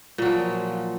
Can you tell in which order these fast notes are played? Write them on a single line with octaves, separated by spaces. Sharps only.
A#2 F#3 F3